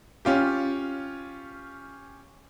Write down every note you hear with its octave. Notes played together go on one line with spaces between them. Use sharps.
C#4 F4 G4